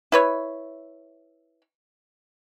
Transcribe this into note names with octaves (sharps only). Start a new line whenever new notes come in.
E4 B4 C#5